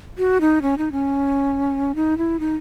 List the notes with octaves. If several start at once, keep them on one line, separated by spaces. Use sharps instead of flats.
F#4
D#4
C#4
D#4
C#4
D#4
E4
D#4